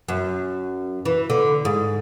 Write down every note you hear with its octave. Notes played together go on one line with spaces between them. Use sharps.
F#2
E3
D3
G#2